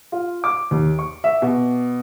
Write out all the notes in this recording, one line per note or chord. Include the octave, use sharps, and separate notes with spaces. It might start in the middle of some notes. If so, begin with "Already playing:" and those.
F4
D6
D#2
C#6
E5
B2